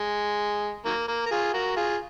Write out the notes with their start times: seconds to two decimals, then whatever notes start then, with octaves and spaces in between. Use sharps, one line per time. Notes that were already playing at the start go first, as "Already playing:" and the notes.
Already playing: G#3
0.86 D#3 F#3 A#3
1.08 A#3
1.26 A#4
1.31 F4 G#4
1.53 F#4 A#4
1.76 F4 G#4